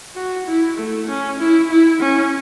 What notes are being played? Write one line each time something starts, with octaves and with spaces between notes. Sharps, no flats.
F#4
E4
A3
C#4
E4
E4
C#4